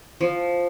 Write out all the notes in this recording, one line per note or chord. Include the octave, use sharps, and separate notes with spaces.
F3